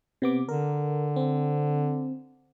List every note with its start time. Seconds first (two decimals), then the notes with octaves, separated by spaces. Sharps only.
0.22 C3 B3 D6
0.49 D3 A#4
1.16 C4